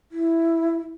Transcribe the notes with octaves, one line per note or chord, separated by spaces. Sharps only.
E4